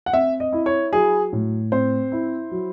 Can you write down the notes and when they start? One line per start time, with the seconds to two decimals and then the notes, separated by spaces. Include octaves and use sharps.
0.06 F#5
0.13 C4 E5
0.40 D#5
0.53 E4
0.66 C#5
0.93 F#3 G#4
1.33 A2
1.72 C4 C5
2.12 E4
2.51 F#3